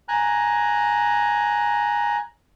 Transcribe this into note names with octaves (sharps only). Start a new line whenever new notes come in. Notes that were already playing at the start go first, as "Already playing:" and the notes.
G#5 A#5 F#6